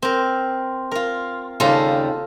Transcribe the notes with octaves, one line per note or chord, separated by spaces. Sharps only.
C4 A#4
F4 A#4
D#2 C#3 G3 F4 A4 A#5